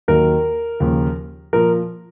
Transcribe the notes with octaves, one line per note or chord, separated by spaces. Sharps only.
D#2 D#3 F#3 A#4
D#2 C#3 F3
A#2 F3 A#4